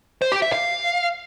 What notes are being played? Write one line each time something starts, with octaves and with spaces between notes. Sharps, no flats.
C5
G4
E5
F5